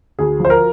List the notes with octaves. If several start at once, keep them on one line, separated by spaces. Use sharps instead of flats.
D2 G#4
F3
C5
A#4